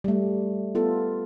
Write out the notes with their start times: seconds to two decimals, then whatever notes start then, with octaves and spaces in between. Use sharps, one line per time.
0.04 G3 A3
0.75 B3 F4 A4